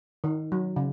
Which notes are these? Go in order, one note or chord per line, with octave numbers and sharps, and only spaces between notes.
D#3
F#3
C#3